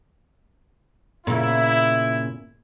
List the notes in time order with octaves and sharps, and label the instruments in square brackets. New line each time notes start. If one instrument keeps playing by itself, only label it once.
[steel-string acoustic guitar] A#2 C#3 [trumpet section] E4